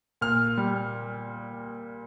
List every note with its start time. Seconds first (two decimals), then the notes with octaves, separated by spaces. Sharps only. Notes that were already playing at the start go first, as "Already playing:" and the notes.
0.21 A#2 F6
0.58 G3